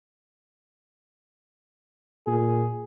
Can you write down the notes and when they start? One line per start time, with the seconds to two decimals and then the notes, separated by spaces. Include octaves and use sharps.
2.27 A#2 G#4